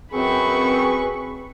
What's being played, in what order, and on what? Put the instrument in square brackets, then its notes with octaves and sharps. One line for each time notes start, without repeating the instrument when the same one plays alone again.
[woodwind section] F#2 C4 [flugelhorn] G#4 [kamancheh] B4 C#6